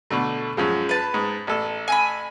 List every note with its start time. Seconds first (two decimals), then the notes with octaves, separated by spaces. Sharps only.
0.11 B2 D3 A3
0.57 F#2 F3 G#3
0.89 B4 A5
1.14 G#2
1.47 A1 A4
1.88 G#5 A#5 B5